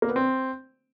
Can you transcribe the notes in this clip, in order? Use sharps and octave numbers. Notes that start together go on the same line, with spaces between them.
A#3
B3
C4